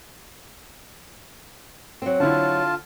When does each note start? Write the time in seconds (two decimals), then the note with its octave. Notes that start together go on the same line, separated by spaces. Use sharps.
2.02 F#3 C4
2.20 D3 E4 F4 A5